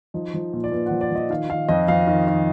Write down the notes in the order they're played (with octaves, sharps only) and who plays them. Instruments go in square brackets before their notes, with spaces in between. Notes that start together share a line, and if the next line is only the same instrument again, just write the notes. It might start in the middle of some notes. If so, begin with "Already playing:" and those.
[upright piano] F3 D#4
F3
A#2
D5
A#2 B4
F3 F#5
D5
F3 D#5
D#3 F5
D#3 F5
F2 D#5
F2 F5
D#3
D#3